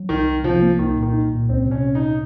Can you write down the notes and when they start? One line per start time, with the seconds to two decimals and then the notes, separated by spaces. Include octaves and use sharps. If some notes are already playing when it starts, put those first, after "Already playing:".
Already playing: F#3
0.09 C2 D#3
0.26 C2
0.44 C3 F3
0.62 A#3
0.79 C2 D#3
0.97 A#2
1.03 D#3
1.14 D#4
1.31 A#2
1.49 C#2 C4
1.66 C3
1.71 C#4
1.83 C3
1.95 D#4